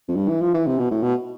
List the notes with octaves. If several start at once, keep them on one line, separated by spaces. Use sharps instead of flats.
F2
G2
E3
F3
E3
C3
B2
A2
B2